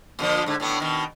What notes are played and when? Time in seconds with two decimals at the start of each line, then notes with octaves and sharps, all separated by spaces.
0.19 A#2 D3 F3
0.46 G#2 D3
0.60 A2 D3 B3
0.80 B2 D#3